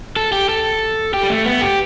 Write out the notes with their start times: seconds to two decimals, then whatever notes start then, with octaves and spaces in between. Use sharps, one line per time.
0.16 A4
0.32 G4
0.49 A4
1.14 G4
1.23 G3
1.30 A3
1.46 B3
1.61 G4